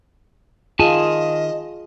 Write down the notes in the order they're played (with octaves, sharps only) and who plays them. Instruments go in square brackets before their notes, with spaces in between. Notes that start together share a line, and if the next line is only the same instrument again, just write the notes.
[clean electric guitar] D#3 G#5 A5 [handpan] F4 G#4 [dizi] D#5